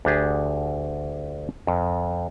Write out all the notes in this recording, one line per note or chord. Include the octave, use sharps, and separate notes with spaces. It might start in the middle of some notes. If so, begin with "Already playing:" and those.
D2 D4 G4 G#4
F2